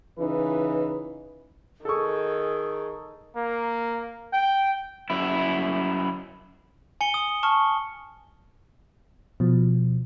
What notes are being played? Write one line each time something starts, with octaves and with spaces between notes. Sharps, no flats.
C#3 E3 D#4 B4
D#3 G#4 A4 C#6
A#3
G5
F#2 E4
G#5 C#7 G7
D#6
A5 C#6 F6
B2 F3